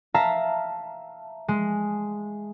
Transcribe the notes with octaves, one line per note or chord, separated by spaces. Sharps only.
E5 F5 A5 A#5 A#6
G#3